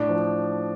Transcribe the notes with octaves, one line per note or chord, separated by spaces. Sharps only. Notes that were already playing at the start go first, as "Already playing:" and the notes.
Already playing: A2 D4
F3